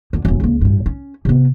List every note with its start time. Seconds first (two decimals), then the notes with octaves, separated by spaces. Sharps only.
0.13 F2 D3
0.25 D#1 F#2
0.40 C#2 A#3
0.61 A1 G2
0.86 C#4
1.25 C3 B3